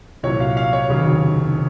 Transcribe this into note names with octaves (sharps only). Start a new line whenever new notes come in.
C2 A#2 F#3 C#5
F5
F5
C#5
F1 D#2 C#3 F#3